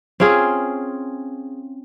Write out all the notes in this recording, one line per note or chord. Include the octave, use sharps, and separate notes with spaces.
C4 C#4 F4 G#4